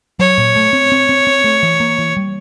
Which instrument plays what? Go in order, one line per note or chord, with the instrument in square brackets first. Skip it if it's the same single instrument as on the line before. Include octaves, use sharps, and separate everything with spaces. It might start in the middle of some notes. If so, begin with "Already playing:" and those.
[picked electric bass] F#3 [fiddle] C#5
[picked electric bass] A#2
A3
C4
C4
C4
C4
A3
E3
A#3
E3
G3